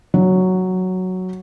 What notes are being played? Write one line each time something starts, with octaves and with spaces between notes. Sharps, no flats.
F#3